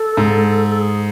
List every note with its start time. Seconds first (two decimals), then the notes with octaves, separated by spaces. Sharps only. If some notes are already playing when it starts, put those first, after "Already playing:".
Already playing: A4
0.17 G#2
0.69 A4
0.79 G#4